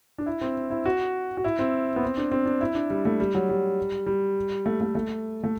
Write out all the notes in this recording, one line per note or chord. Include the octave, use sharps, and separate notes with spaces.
D4
E4
C4
E4
F#4
F#4
E4
C4
B3
C4
D4
C4
D4
E4
D4
G3
A3
G3
F#3
G3
G3
A3
A3
A3
A3